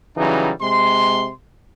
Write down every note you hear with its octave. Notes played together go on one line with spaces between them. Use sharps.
C#3 E3 F#3 G3 D#4
C3 G#3 C6